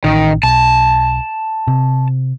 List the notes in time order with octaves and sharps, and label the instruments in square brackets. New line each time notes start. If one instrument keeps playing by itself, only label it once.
[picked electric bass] A1 [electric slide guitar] D#3
[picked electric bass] B1 [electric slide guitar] A5
[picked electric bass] C3